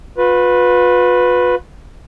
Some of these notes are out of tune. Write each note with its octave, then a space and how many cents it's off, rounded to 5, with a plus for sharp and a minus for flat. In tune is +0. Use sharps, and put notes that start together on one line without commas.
F4 +45 B4 +0